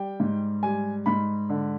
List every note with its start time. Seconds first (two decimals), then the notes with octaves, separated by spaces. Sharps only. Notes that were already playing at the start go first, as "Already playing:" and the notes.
Already playing: G3 G5
0.20 G#2
0.63 G3 G#5
1.06 G#2 B5
1.50 D3